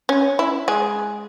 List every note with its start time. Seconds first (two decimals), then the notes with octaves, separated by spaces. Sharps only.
0.09 C#4
0.39 E4
0.68 G#3 G#4